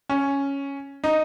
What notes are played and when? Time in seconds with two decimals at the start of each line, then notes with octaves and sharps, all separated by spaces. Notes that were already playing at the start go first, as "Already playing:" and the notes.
0.10 C#4
1.04 D#4